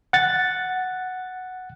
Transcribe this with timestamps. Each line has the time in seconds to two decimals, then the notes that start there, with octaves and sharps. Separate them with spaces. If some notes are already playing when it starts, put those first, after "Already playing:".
0.13 F#5 A6